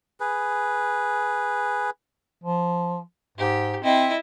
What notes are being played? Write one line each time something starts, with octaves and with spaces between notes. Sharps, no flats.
G#4 B4
F3
G#2 G4
C4 E4 D#5